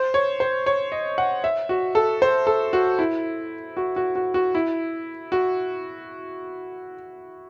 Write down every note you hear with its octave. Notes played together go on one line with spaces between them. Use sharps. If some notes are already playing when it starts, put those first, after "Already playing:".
Already playing: C5
C#5
C5
C#5
D#5
F#5
E5
F#4
A4
C5
A4
F#4
E4
F#4
F#4
F#4
F#4
E4
F#4